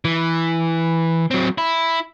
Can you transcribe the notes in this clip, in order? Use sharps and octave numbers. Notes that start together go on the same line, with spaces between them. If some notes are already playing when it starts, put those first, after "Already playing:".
E3
F#3 C4
E4